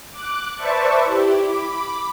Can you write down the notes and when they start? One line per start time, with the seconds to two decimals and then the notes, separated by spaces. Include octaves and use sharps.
0.11 D6 F#6
0.56 B4 C5 D5 E5 A5 C#6
1.03 E4 G4
1.42 B5 D6